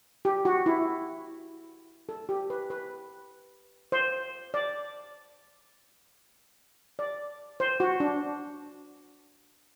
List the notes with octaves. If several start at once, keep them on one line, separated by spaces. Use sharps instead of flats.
G4
F#4
E4
A4
G4
B4
B4
C5
D5
D5
C5
F#4
D4